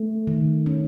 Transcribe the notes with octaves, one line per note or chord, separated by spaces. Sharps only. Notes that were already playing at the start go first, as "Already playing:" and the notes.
Already playing: A3
D#3
C#4